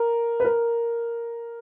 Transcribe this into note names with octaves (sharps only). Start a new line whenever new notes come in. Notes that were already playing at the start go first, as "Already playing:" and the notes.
Already playing: A#4
B4
A#4